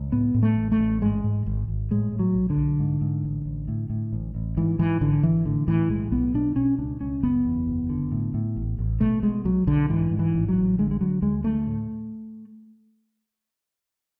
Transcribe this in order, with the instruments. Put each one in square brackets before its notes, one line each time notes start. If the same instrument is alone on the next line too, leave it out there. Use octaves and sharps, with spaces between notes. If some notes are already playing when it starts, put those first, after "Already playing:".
Already playing: [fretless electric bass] C#2
A2 B3
A2
A3
A1
A3
A1
G#2 G#3
G#2
G#1
G#1
A2 G#3
A2
F#3
B1
D3
B1
G#2
G#2
A1
A1
A2
A2
A1
A1
G#2 E3
G#2 E3
G#1 D3
G#1 E3
A2 D3
A2 E3
B1 G#3
B1 B3
B2 D4
B2 C#4
C#2 D4
C#2 C#4
F#1 B3
E2
F#1
D3
A2
A2
A1
A1
B2 A3
B2 G#3
B1 F#3
B1 D3
G#2 E3
G#2
E3
A1
F#3
A1
D3 G#3
G#3
D3 F#3
D2 G#3
D2 A3
A2